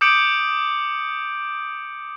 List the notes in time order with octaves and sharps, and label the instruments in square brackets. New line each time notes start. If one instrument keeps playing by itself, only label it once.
[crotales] D6 D#6 G6 C#7 D7 F#7